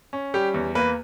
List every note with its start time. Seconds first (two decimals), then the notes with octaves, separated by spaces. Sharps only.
0.13 C#4
0.34 G3 G4
0.54 E2
0.75 A#3 B4